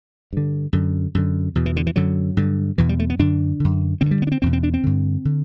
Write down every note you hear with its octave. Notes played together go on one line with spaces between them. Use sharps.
G2 D3
F#2 D3
F#2 D3
E2 B2
E3
D3
E3
F#2 D3 F#3
G2 D3
E2 B2 E3
G3
A3
B3
F#2 D3 D4
F#2 D3
G2 D3 C4
G3
B3
D4
C4
E2 B2 C4
C4
D4
C4
G2 D3
D3